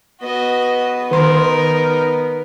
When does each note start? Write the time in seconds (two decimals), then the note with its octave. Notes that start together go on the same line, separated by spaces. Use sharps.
0.22 B3 F#4 D#5
1.11 D#3 D#4 A#4 C6